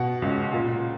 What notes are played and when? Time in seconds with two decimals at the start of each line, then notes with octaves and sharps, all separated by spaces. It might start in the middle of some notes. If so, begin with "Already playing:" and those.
Already playing: B2 F#5
0.22 C#2
0.53 A#2